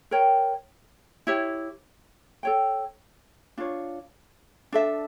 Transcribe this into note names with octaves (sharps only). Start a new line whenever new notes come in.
A#4 C#5 G5
E4 G4 C#5 E5
A4 C#5 G5
D4 F4 C#5
D4 A4 E5